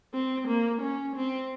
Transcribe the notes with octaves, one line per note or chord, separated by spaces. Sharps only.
C4
A#3
C#4
C4